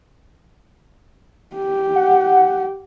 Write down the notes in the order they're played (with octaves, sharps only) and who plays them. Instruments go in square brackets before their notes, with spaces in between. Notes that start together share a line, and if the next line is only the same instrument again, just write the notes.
[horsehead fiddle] G4
[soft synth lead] F#5